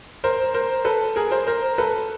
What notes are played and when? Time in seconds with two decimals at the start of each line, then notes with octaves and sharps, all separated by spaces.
0.24 A#4 C5
0.54 A#4 C5
0.85 A4 B4
1.16 G#4 A#4
1.31 A#4 C5
1.47 A#4 C5
1.78 A4 B4